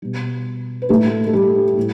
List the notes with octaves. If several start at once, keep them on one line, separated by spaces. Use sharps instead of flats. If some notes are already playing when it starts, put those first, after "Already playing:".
B2 G3
B4
A2 G3 A3 A4
A4
G3 G4
A2